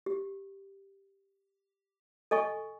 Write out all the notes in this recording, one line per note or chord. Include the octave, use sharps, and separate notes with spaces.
G4
A4 D#5 G#5 C#6